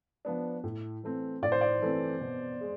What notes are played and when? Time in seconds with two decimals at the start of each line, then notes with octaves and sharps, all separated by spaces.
0.25 F3 B3 D4
0.64 A2
1.03 E3 A3 C4
1.42 A2 D5
1.52 C5
1.61 D5
1.82 E3 A3 C4
2.21 B2
2.61 G#3